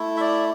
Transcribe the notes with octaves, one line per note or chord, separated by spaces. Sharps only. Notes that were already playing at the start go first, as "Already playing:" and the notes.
Already playing: A3 E4
E5
D5